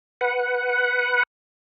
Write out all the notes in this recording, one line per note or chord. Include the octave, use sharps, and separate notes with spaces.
B4 F#5